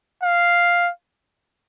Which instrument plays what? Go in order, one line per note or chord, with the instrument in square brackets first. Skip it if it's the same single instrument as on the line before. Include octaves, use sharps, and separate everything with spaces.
[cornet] F5